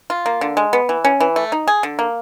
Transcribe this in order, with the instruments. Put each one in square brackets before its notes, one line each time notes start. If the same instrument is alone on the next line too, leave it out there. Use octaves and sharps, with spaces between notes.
[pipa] F4
A#3
D3
G#3
B3
E3
C#4
E3
A3
D#4
G#4
D3
A#3